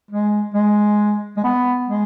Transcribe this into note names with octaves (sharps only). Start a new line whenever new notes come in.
G#3
G#3
G#3
B3
G#3